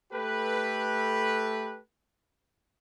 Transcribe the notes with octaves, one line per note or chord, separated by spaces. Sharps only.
A3 G4 A4 B4